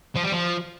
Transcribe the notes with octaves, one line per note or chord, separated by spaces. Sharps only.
F3
G3
F3